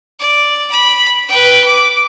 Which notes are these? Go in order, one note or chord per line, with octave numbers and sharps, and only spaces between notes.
D5
B5
B4 G5
D6